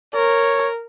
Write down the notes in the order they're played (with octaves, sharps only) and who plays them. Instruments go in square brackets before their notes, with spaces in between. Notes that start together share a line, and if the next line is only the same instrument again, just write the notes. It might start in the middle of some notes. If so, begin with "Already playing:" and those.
[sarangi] A#4 [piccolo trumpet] C#5